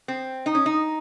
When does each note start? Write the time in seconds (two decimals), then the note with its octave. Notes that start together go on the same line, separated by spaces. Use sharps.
0.08 C4
0.46 D#4
0.55 C#4
0.66 D#4